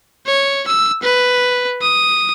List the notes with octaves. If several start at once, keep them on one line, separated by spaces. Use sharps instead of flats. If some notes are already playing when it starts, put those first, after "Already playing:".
C#5
E6
B4
D#6